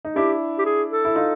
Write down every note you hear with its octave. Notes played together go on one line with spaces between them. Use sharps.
D#4
D4 E4 G4
G4
G#4
A4
E4
D#4 F4